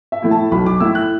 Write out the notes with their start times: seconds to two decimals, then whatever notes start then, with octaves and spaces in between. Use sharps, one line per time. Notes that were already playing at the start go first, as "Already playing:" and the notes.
0.12 E5
0.22 A2 A3 E4
0.31 A5
0.51 B1 B5
0.66 D6
0.80 A2 A3 E4 E6
0.95 F#6